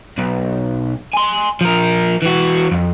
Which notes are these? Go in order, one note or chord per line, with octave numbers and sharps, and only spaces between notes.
B1
G#5 C6
F3 A#4
E3 F#4
F2